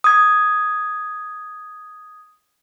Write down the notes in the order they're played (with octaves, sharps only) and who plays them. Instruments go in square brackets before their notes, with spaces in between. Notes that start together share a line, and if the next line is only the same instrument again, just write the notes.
[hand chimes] D#6 G#6